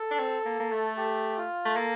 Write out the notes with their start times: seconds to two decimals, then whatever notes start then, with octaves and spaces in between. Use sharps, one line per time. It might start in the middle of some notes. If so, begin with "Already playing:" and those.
Already playing: A4
0.11 D4
0.19 C4
0.46 A#3
0.60 A#3
0.72 A3
0.97 G4
1.37 F4
1.65 A3
1.76 A#3 A4